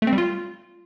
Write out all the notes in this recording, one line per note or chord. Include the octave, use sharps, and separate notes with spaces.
A3
C4
G3
F4